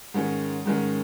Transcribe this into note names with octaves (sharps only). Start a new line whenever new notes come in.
G#2 D#3 G#3 C#4
G#2 D#3 G#3 C#4